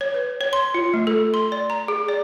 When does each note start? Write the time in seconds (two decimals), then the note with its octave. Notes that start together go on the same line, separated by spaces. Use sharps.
0.01 C#5
0.14 B4
0.41 C#5
0.53 C6
0.75 F4
0.94 A3
1.07 A4
1.34 C6
1.52 D5
1.70 A#5
1.88 G#4
2.09 D5